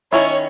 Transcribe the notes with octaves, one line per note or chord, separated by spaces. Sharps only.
D#3 F#3 C#4 E4 C#5